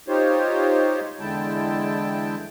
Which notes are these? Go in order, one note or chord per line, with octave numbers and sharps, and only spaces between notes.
D#4 F4 G4 C5 C#5
E2 D3 G#3 E4 G5 A5